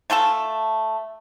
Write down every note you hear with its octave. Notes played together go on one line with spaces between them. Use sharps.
A3 F4 A4 A5